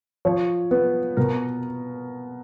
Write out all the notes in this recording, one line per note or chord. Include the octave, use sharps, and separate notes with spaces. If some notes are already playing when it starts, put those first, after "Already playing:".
F3 C#5
B3 B4
B2 A#4